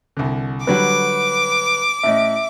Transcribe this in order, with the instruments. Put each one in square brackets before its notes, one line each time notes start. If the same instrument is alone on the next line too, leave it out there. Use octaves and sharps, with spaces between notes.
[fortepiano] C2 D3
[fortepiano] D3 F#3 G3 [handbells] B4 [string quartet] D6
[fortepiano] A1 A2 D#5 [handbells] E5